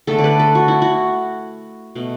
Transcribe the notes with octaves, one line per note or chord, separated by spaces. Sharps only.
D3 A3 A4
D5
B4
A4
F#4
E4
F#4
B2 A3